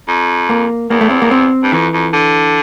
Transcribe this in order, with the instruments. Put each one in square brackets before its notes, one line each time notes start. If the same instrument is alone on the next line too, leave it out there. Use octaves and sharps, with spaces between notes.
[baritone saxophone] F2
[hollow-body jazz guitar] A#3
[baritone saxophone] E2 [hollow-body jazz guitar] A#3
[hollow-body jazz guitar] A3
C4
A#3
C4
[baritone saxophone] G2
[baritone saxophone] F2 [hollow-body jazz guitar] E3
[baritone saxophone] F2
D3